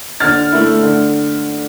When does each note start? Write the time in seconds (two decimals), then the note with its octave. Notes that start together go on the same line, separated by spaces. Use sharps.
0.20 D3 F6 A6
0.52 A3 E4
0.83 D3